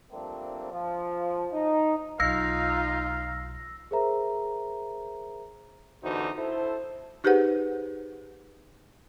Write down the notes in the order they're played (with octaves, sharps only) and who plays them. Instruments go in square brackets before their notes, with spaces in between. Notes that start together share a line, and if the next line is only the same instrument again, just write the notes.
[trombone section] F3 G3 A3 A#3 C4 D4
F3
D#4
[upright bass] B1 [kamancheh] D#4 F4 [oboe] F5 [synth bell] E6 A#6
[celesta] G#4 A#4 C5 E5 A#5
[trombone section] A1 E2 D3 D#4 F#4 C5
E4 A4 C5
[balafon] D#4 G4 G#4 B4 C5 F#5